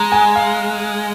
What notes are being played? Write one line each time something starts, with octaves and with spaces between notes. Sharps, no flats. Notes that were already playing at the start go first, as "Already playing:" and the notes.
Already playing: G#3 A#5
G#5
F5